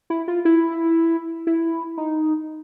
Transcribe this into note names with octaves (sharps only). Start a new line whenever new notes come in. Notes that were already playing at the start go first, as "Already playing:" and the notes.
E4
F4
E4
E4
D#4